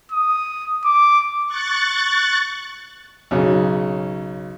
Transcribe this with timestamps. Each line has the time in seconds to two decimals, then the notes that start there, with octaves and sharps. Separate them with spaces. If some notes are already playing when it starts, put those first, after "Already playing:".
0.12 D#6
0.85 D6
1.46 C#6 F#6 A6
3.31 B1 C#3